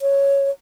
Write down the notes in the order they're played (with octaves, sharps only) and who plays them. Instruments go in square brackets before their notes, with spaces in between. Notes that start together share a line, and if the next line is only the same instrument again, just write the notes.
[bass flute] C#5